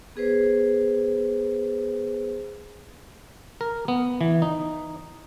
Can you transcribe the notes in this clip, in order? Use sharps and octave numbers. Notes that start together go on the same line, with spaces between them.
B3 G#4 B4 C5
A#4
B3
E3
D#4